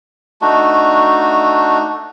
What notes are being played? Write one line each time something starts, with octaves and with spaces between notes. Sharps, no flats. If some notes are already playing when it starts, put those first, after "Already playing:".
A3 D4 D#4 F#4